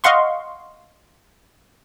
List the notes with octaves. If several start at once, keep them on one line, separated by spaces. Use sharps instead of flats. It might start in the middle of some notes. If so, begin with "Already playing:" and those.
D#5 F5 F#5 C6 C#6